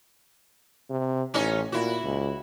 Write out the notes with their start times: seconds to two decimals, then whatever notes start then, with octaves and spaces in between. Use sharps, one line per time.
0.90 C3
1.34 A1 C#4 D#4 C#5
1.72 A#2 E4 F#4
2.03 C#2